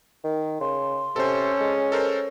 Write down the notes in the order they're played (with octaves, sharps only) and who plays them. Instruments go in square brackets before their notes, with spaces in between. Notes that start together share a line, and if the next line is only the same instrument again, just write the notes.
[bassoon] D#3
[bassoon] C#3 [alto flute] C6
[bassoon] C3 [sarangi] C#4 [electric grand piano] A4 C5
[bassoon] G#3
[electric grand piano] A4 A#4 C5